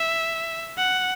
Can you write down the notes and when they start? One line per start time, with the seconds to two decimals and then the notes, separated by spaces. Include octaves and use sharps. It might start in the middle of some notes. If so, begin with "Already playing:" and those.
Already playing: E5
0.77 F#5